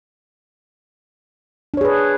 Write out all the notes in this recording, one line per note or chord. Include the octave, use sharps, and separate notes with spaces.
D4 G#4 B4 C#5